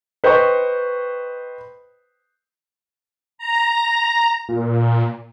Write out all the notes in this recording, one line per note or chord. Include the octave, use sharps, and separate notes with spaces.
B4 C5 D#5 G5 C#6
A#5
A#2